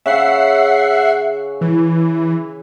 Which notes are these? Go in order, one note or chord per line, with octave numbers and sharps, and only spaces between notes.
C#3 E5 F#5 C7
E3